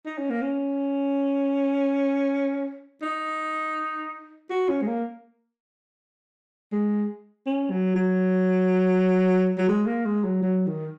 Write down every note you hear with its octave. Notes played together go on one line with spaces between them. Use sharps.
D#4
C#4
A#3
C#4
D#4
F#4
C#4
G#3
A#3
G#3
C#4
F#3
F#3
F#3
G#3
A#3
G#3
F#3
F#3
D#3